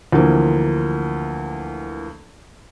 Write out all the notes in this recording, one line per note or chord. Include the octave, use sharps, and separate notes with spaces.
D2 E3 F3 A#3